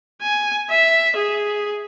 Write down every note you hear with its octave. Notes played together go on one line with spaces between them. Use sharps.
G#5
E5
G#4